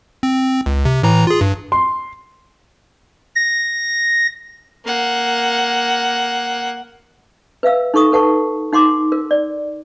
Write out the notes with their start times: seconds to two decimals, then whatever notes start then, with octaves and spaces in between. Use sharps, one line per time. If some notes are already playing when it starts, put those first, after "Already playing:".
0.23 C4
0.66 C#2
0.85 C3
1.03 A2 E3 A#5
1.27 F4 G#4
1.41 G2
1.72 C6
3.35 A#6
4.86 A#3 F#5
7.63 B4 E5 F5 E6
7.94 D#4 A4 C#6 D#6
8.12 A4 B4 F#5 A5 C#6
8.72 D#4 F#5 C6 D6
9.12 A#4
9.31 D5